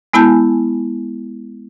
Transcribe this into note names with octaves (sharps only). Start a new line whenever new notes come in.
G#3 B3 E4 G#5 A5 G6